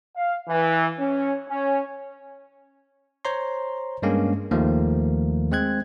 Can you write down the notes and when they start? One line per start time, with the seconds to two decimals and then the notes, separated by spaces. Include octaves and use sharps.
0.17 F5
0.49 E3
0.99 C#4
1.49 C#4
3.25 C5 C#5 A#5 C6
4.02 G2 G#3 A#3 C#4
4.51 D#2 D#3 F3 A3 A#3
5.51 G#3 C4 F#6 G#6